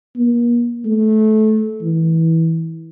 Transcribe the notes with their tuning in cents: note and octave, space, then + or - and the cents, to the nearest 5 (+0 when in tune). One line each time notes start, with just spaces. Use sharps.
A#3 +40
A3 -20
E3 -20